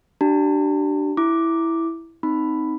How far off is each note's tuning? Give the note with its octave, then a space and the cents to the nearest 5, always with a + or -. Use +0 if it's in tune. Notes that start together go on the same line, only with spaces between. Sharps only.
D4 +10 G4 -35 A5 +45
E4 +0 D6 +0
C4 -5 D#4 +0 B5 +5